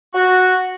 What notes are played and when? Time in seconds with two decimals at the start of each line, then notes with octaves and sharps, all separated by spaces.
0.14 F#4